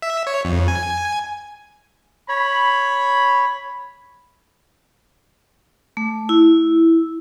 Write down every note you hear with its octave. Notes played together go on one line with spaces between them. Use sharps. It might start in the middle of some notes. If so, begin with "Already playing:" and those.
E5
C#5
F2
G#5
C#5 B5
A3
E4